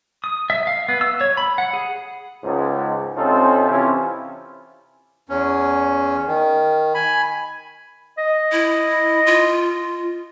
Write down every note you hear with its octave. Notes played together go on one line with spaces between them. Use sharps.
D#6
E5
F5
B3
E6
C#5
B5
F#5
G#4
C#2 G#2
C3 C4 C#4 D#4 F4 A4
C3 E3 C#4 E4 F4
E2 C#4
D#3
G#5 B5
D#5
E4
F4